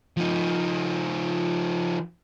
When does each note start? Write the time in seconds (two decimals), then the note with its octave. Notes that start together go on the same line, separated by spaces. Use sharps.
0.17 F3 D#4